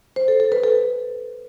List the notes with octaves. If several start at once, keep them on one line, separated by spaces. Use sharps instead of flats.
C5
A4
A4
B4
A4